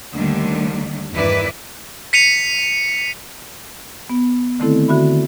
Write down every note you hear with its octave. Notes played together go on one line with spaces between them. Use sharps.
D#2 D3 D#3 G3 A3 D4
E2 G2 D#3 E4 B4 D5
B6 C#7 D#7 F7
B3
D3 D#3 A3 C4 E4 A4
D3 F#4 E5 B5